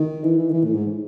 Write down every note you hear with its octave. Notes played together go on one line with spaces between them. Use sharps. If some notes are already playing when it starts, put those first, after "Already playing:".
Already playing: D#3
E3
E3
D#3
E3
A2
G#2